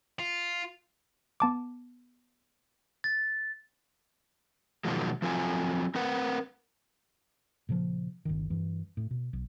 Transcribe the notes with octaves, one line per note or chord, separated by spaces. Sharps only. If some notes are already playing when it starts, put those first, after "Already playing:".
F4
B3 A5 D6
A6
B2 D#3 F3 F#3 G#3
F3 F#3 C4 F4 G#5
C4 A#4 B4 F#5
A#2 C#3 E3 F3
G1 C#2 D#3
G2 E3
A2
B2
B1